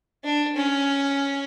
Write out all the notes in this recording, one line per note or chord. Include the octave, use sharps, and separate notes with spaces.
D4
C#4